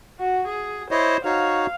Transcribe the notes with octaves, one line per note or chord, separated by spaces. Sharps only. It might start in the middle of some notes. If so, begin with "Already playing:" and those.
F#4
G#4
E4 C5 C#5 D#5
D#4 F#4 C#5 F5